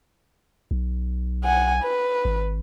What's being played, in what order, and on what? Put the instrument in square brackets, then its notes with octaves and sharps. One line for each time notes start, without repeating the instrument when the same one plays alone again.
[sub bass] B1
[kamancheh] F#5 G#5
B4
[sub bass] G#1